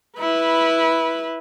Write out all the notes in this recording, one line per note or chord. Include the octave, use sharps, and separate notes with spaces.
E4 B4